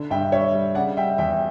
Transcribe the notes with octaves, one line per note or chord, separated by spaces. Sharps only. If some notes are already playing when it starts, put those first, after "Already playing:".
Already playing: D3
G2 E5 G5
G3 C#5 E5
G3
C#3 D5 F#5
G3 E5 G5
E2 E5 G5